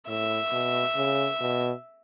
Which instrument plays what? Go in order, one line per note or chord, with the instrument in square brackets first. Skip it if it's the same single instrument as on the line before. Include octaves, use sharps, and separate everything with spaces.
[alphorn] A2 [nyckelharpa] E5
[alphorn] B2
C#3
B2